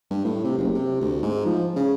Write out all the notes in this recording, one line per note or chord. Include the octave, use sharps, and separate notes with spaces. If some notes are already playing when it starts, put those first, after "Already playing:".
G2
A2
C3
F#1
C3
D2
G#2
F3
C#3